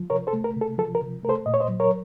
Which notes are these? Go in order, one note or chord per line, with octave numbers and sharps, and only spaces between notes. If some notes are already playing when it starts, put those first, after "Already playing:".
Already playing: F3
C3 A#4 C#5
A4 C5
A3
A#4
C3
A4
F3 A4
A#4
C3
A3 A#4
A4 C5
A#2 D#5
C#5
C5 D#5
F#3
A#4 C#5